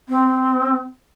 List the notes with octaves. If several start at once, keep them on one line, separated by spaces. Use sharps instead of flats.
C4